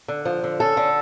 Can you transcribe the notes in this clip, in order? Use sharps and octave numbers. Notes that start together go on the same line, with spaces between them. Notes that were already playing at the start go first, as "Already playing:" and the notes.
D3
F3
D3
C#4 A4
D3